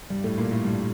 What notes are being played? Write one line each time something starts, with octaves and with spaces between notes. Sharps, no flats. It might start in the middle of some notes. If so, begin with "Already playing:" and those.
G2 G3
A2 A3
A#2 A#3
A2 A3
G2 G3